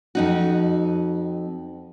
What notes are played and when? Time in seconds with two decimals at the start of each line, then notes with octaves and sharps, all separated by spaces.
0.15 F2 D#4 F#4